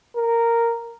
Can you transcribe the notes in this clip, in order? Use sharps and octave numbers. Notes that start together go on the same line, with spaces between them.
A#4